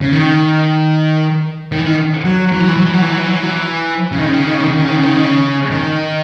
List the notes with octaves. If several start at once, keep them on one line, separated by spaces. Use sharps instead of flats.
C#3
D#3
D#3
E3
D#3
F#3
E3
F#3
E3
F#3
E3
F#3
E3
F#3
E3
F#3
E3
F#3
E3
C#3
D#3
C#3
D#3
C#3
D#3
C#3
D#3
C#3
D#3
C#3
D#3
C#3
D#3
C#3
D#3
C#3
D#3